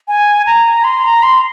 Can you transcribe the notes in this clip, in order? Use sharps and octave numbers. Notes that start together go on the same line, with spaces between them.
G#5
A#5
C6
A#5
C6